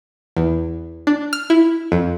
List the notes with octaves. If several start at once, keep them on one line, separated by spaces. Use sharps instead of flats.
E2
D4
F6
E4
F2